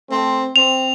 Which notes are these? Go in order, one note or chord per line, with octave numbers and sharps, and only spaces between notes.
A3 C4
C4 F7